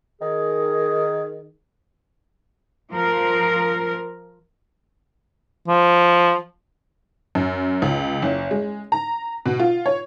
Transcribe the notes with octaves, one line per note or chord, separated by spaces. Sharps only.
D#3 G#4
F3 A#4
F3
F#2
C#2
F#1
G#3
A#5
B2
F4
C#5